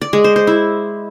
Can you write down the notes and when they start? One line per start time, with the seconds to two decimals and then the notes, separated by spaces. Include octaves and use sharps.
0.01 D5
0.13 G#3
0.24 C5
0.36 C5
0.47 E4